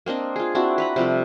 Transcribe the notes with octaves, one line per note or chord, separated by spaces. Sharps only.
A#3 C4 D4 D#5
F4 G#4
C4 D4 E4 F#4
B4 A#5 B5
C3 F3 G3 A3